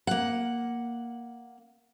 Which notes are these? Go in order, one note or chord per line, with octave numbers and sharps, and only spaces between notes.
A#3 F#5